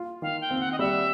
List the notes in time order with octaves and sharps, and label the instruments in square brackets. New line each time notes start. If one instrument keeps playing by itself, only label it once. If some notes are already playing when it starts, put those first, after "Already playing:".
Already playing: [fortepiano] F4
[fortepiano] D#3 [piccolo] F5
[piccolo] G5
[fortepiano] C4
[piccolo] F#5
D#5
[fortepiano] G3 [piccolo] E5